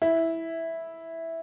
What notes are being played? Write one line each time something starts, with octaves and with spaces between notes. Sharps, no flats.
E4